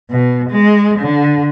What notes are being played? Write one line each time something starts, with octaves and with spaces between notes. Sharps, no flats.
B2
G#3
D3